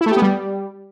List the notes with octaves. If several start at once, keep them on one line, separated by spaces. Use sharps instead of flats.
E4
A3
G4
B3
G3